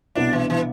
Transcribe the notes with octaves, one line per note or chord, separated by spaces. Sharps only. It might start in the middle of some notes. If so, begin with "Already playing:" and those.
C2 B2 B3 D4 E4
E3
E3